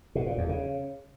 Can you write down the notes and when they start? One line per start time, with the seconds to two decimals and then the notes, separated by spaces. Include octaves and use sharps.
0.15 B2
0.27 A#2
0.38 E2
0.49 C#3